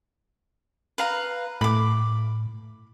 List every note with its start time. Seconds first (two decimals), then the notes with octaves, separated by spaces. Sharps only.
0.98 B4 F5 A#5
1.61 A2 B5 D6